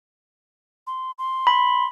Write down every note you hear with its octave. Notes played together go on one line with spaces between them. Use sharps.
C6
C6
B5